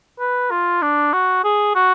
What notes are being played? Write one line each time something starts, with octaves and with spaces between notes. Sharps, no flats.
B4
F4
D4
F#4
G#4
F#4